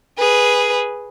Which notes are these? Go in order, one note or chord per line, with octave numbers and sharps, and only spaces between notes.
G#4 B4